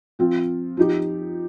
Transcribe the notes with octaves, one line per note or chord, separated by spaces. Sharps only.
F3 C4 F4
F3 D#4 G4